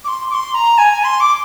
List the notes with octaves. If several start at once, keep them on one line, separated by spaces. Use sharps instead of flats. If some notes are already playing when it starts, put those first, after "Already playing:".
D6
C6
D6
C6
A#5
G#5
C6
D6